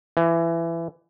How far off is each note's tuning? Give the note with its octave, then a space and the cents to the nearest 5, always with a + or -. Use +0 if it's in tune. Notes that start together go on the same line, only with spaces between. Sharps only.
E3 +20